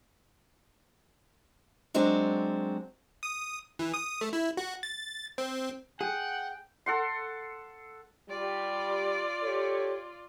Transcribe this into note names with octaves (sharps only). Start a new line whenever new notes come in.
F#3 G#3 C4 D4 F#4
D#6
E3
D#6
A3
E4
F#4
A6
C4
G#4 F#5 G5
A4 F#5 C6
G3 F4 D5
G4 A4 C#5